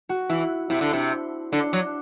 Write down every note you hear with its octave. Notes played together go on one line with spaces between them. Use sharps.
F#4
E3 E4
C3 E4
D3
C3
D3 D4
F#3